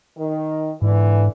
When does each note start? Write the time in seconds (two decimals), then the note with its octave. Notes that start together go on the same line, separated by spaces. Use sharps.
0.18 D#3
0.82 G#2 D3 E3